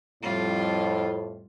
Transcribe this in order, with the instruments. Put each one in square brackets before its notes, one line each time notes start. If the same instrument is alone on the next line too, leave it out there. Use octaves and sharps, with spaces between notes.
[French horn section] F2 A2 [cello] G3 F4